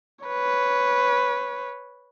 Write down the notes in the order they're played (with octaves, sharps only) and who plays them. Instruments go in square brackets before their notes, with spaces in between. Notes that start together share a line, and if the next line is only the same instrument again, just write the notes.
[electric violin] B4 C#5